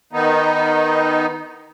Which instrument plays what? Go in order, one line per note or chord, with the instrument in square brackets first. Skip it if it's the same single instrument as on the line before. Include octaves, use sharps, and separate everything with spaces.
[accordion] D#3 B3 D#4